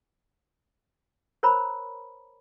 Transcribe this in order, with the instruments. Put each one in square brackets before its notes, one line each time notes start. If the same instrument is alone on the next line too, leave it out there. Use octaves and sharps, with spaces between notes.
[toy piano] A#4 C5 C#5 A#5 B5